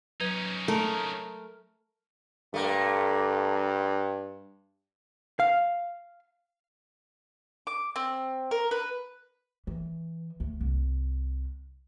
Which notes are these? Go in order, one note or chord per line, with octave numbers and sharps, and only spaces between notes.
F#3 C#4 D#4 B4 G#6
A3 A#4
G2 A3 A#3
F5
D6
C4
A#4
B4
E3
D2
C2